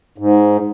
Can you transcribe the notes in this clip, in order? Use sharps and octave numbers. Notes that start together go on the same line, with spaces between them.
G#2